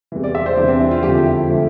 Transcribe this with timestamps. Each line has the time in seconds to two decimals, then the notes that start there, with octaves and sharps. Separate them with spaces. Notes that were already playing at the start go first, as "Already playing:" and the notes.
0.12 E2 C3 E3
0.24 D5
0.35 E5
0.46 C5
0.57 E2 C3 E3 D4
0.68 C4
0.80 E4
0.91 F4
1.03 F2 D3 F3 A3 G4
1.26 E4
1.49 D3 F3 A3